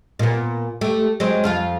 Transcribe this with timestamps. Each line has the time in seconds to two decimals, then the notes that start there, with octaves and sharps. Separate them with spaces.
0.19 A#2 B3
0.81 A3 G4
1.20 F#3 G#3 C4
1.44 F2 F4 F5